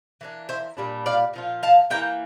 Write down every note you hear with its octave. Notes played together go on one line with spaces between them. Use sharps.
E3 A#3 D4
C5 E5
A#2 G3 D4
D5 F5
A#2 F3 F4
F5 A5
C3 E3 A#3 G5 A#5